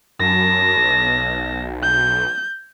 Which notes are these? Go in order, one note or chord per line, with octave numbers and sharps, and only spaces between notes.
F#2 A5 A#6
B1
G6